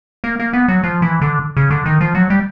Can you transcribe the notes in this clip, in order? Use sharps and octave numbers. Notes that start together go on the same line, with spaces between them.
A#3
A#3
B3
F#3
F3
E3
D3
C#3
D3
D#3
F3
F#3
G3